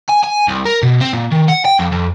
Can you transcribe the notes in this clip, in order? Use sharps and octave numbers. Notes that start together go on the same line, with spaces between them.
G#5
G#5
C2
A#4
B2
C4
A#2
D#3
F#5
G5
F2
F2